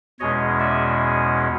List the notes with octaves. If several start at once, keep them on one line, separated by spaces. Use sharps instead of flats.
E2 B2 G#3 C#4 C#5 D#5
D5 E5